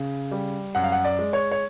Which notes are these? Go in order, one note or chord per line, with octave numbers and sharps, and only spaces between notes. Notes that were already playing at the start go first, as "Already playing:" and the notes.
Already playing: C#3
G3
F#2 F#5
F5
F#5
D5
G#3
C#5
C#5